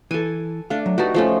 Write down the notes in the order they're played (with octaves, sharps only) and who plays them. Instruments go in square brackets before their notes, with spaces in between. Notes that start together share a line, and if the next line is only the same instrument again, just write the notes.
[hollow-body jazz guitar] E3 [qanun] A4 G#5
[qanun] A3 D4 [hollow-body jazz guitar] F5
[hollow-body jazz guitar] F#3
[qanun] D#4 F#4 [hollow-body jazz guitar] G4 B4 A5
[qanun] F3 A3 C#4